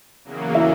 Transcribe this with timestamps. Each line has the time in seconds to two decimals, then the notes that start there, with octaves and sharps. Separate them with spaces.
0.25 E2 C#3 F#3 A#3
0.55 E4 E5